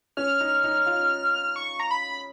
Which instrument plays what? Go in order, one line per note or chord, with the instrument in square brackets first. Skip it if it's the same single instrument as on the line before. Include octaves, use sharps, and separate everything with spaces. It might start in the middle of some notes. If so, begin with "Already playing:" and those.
[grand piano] C#4 [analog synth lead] F6
[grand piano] D#4
D#4
F4
[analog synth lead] C#6
A#5
B5